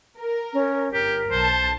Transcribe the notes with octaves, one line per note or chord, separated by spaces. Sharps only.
A#4
C#4
G1 G4 A#4
B1 C5 A5